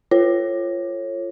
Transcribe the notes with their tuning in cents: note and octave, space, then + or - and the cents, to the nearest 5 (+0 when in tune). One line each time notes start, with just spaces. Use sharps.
F4 -15 A4 +15 C#5 -25